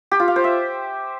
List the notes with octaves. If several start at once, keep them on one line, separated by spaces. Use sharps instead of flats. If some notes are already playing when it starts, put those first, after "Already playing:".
G4
F4
F5
C5
E5